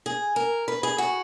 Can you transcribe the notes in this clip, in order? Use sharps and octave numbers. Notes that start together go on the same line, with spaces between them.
G#4
A#4
B4
G#4
F#4